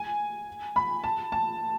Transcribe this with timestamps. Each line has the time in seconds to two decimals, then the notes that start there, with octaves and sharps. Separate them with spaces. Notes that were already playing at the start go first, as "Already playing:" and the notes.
Already playing: G#5
0.76 B5
1.04 A5
1.32 A5